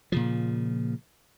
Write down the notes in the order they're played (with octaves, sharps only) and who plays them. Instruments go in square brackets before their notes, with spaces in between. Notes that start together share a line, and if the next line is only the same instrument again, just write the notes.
[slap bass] A#2 C#3 F3